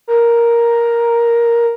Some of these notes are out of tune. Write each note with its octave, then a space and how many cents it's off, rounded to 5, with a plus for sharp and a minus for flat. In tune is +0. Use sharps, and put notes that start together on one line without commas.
A#4 +5